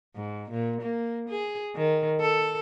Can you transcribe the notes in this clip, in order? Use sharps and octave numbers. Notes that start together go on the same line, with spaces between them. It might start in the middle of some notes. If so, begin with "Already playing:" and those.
G#2
A#2
A#3
G#4
D#3
A4